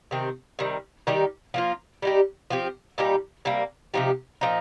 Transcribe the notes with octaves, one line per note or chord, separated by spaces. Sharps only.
C3 D#3 C4
C3 D#3 G3
D#3 G3 D#4 G4
F3 A#3 F4
G3 D#4 G4
F3 C4 G4
A#2 G3 D#4 G4
C3 G3 A#3
C3 F3 D#4 G4
A#2 F3 D#4